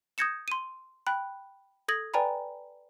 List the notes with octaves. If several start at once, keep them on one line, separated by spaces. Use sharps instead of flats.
D#6 G6 G#6 A#6 C#7 E7
C6 D#7
G5 B5 F#6
A4 D#6 G#6 A#6 F#7
B4 D5 G5 G#5 A#5 B5